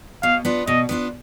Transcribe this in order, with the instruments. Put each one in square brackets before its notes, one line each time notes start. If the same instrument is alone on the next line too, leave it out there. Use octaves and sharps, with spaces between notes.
[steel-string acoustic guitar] B2 [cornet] F5
[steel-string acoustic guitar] B3 D4 F4
[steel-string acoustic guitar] B2 [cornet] D#5
[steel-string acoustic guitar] B3 D4 F4